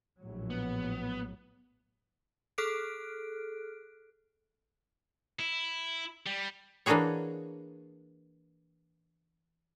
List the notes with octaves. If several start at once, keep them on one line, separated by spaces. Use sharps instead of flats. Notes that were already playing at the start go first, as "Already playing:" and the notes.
A#1 A2 F#3
B3
G#4 A4 F6 F#6 D7
E4
G3
E3 A#3 D4 F#4 G#4 C#5